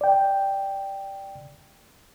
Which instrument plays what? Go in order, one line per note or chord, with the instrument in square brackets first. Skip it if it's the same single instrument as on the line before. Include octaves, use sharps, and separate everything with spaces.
[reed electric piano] D5 G5